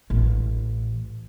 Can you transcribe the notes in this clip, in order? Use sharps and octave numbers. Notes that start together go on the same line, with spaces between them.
A1